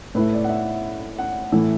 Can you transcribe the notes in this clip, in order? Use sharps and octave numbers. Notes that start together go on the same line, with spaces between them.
A2 A3 E4 B4
D5
F#5
E5
F#5
A2 E3 A3 E4